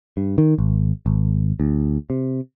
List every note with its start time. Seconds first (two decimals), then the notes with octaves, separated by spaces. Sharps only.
0.17 G2
0.38 D#3
0.58 G#1
1.06 G#1
1.60 D2
2.10 C3